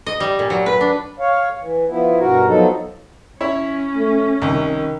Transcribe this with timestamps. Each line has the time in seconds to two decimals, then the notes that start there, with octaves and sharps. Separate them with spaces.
0.06 D#5
0.20 G3
0.39 A#2
0.50 F#3
0.66 B4
0.81 D4
1.19 C#5 F5
1.62 E3
1.88 F3 B3 E4
2.20 G2 B2 F#4 A#4
2.47 F3 F#3 B3 D#4 A4
3.41 C#4 E4 C#5
3.96 A3
4.42 C2 D#3